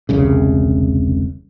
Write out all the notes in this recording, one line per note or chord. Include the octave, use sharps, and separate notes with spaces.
E1 C2 C#3